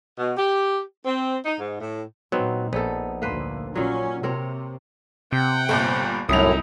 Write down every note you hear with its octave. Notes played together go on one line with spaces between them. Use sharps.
B2
G4
C4
D#4
G#2
A2
A#2 F#3 B3 C4 D#4
A#1 B3 D#4 A4
D2 A#3 B4 C5
A#2 F#3 C#4
C3 C4 A#4 C#5
C3 F#5 G5
G1 G2 A#2
C2 F#2 A2 D#4 E4 D#6 F7